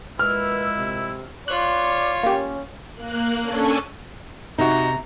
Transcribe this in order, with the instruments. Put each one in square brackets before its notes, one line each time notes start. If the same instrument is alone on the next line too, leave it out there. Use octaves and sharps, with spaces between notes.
[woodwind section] A#2 G#3 E6 [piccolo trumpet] E4 [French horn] B4 [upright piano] F6
[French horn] C3
[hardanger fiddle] F4 C#5 [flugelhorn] D5 [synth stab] F#6
[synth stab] A#3 G4 [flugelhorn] C#4
[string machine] A#3 F#6
C#4 D4 A4 G#5 A5 C#6
[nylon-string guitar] C3 [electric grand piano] D#4 F#4 [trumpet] A#5